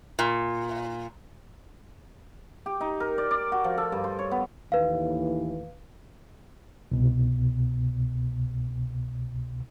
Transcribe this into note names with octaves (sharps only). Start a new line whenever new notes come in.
A#2
G4
D#4
A#4
D5
D5
F#4
F3
A4
G2
C5
C#5
B3
D#2 A2 E3 B4 F5
C2 B2